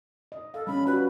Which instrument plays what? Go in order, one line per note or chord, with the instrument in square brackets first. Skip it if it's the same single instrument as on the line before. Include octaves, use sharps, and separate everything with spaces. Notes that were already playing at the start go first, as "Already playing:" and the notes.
[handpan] D#5
[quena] A4 [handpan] F5
[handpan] G3 C#4 D4 [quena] B5
[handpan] F4 F#4 [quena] B4